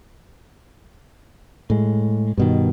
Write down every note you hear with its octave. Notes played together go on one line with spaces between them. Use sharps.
A2 G#3
G2 B2 D#3